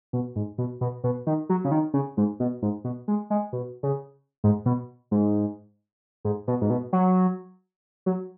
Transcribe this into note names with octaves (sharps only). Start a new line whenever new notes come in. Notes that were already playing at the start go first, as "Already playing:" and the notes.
B2
G#2
B2
B2
B2
D#3
F#3
C#3
D#3
C#3
G#2
B2
G#2
B2
G#3
G#3
B2
C#3
G#2
B2
G#2
G#2
B2
G#2
B2
F#3
F#3